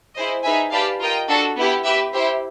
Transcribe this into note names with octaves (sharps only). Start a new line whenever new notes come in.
E4 G#4 C5 D#5
D#4 G#4 B4 E5 G#5
G4 B4 D5 F5 A5
F4 A#4 D#5 G5
D4 F#4 A4
B3 E4 G4
G4 B4 E5
E4 G4 C5 E5